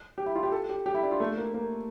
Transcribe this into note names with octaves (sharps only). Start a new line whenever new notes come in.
G4
E4
F4
G4
A4
G4
G4
E4
D4
F4
A3
A#3
A#3